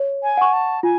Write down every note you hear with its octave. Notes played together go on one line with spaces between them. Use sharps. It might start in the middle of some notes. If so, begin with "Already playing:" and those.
Already playing: C#5
G#5
F#5 C#6
A5
F4 G#5